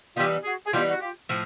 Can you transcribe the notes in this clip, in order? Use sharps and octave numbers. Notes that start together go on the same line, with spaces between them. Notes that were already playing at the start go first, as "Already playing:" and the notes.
E3 G3 B3 D#4 F4 G4
F#4 G#4
G#4
E3 G3 B3 D#4 F4 G4
F#4
F4 G4
A2 F3